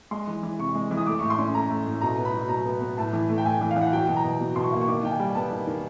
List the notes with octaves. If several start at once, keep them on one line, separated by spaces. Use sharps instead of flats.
G#3 C6
E3
E3
C3 C#6
G#3
E3
D#6
A3 D6
A2 C#6
C6
C#4
A3 A#5
A3
A2
B2 A#5
B3
B5
F#3
B2 A#5
B3
B3
A2 A5
E3
A3
G5
A2 G#5
E3
F5
E3
F#5
F#3 G5
B2
A#5
B2
B2
B2 C6
C#6
A#3
C#6
D#3 D6
D#3 G5
G#5
G3
B3 A5
D#3
D#3